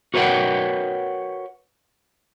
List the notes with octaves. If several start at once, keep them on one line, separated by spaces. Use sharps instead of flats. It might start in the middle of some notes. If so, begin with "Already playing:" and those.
F#4 A#4 B4 C#5 F#5 G5